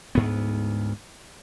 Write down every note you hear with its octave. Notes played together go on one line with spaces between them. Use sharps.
D2 G#2 B3